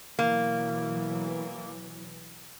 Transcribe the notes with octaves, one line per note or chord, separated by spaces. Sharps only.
B2 E3 F#3 A#3